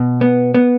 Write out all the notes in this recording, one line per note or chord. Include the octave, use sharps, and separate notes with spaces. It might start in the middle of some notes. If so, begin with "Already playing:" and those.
Already playing: B2
B3
B3